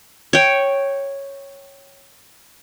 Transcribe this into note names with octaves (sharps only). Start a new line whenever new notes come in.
C#5 G5